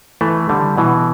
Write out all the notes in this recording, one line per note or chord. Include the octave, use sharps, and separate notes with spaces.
E3 A3
D3 G3
B2 E3